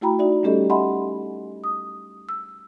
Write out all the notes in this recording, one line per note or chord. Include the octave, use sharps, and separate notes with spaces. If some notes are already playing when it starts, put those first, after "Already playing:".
A3 E4 F#4 G5 A#5 B5
D#4 F#4 D5 E5
G3 A3 C#4 G4 A4 D#5
D#5 E5 F#5 G#5 B5 C6
D#6
E6